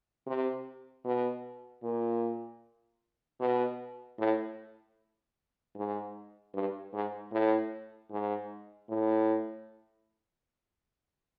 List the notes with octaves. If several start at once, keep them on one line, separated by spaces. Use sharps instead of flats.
C3
B2
A#2
B2
A2
G#2
G2
G#2
A2
G#2
A2